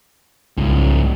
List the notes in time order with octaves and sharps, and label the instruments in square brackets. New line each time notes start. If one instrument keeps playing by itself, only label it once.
[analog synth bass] C2 [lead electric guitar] G#2 C#3